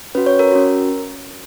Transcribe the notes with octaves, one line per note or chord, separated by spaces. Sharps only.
C#4 F#4 B4
C#5
A#4
C#4 F#4